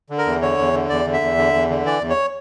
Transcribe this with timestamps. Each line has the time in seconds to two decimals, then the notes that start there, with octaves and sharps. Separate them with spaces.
0.10 D3
0.18 A#4
0.26 E2
0.41 D3 C#5
0.58 E2
0.73 D3
0.89 E2 D5
1.05 D3
1.13 E5
1.21 E2
1.37 D3
1.54 E2
1.70 D3
1.85 E3 D5
2.01 E2
2.10 C#5